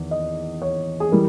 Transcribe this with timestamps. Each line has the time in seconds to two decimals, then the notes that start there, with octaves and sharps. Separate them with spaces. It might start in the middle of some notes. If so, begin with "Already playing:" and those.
Already playing: E2 D#3
0.11 D#5
0.62 C#5
1.00 G#4
1.11 E3 G3 A#4